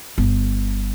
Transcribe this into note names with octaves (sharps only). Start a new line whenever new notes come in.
G1